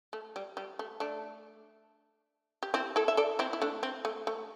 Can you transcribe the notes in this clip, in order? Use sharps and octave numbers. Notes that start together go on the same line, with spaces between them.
A3
G3
G3
A3
A3 D4
G4
C4 E4
E4 A4
E5
A4 D5
C4 E4
E4
A3 D4
C4
A3
A3